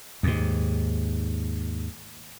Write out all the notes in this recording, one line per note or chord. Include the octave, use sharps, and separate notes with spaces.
D#2 G#2